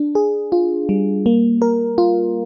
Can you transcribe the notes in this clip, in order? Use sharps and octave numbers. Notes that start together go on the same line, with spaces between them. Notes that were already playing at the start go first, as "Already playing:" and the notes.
Already playing: D4
G#4
F4
G3
A#3
A#4
F4